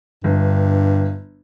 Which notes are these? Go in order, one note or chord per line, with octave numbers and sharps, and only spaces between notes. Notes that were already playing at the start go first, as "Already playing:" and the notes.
G1 G2